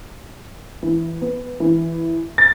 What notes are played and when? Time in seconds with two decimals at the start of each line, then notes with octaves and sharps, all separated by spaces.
0.83 E3
1.22 B3
1.60 E3
2.38 A6